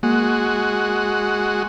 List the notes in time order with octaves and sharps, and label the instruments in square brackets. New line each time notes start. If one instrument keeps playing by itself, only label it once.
[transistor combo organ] G#3 F#4 [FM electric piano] A#3